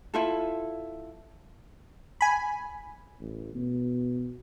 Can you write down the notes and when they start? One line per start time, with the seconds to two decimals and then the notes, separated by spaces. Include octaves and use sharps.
0.14 E4 F4 A4
2.21 G#5 B5
3.20 A1
3.54 B2